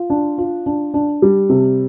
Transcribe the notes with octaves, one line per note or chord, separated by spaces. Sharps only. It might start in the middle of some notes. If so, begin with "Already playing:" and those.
Already playing: F4
D4
F4
D4
D4
G3
C3